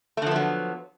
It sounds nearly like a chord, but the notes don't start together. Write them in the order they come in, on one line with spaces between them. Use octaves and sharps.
A3 D3 F3 B3 F#3